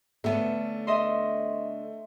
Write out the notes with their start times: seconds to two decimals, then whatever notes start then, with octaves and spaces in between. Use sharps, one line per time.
0.24 D3 A3 B3 C#4
0.87 D#5 E5 C6